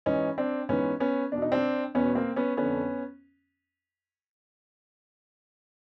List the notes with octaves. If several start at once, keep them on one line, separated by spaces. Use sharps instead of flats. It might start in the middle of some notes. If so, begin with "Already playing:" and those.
G#2 E3 C#4 D#4
C4 D4
G#2 E3 B3 C#4
B3 C#4
E2 B2 D4
D#4
C4 D4
E2 B2 B3 C#4
A#3 C4
B3 C#4
F2 D3 B3 C#4